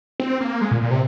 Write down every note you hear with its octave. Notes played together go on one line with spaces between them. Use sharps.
C4
A#3
G#3
A#2
A#2
C3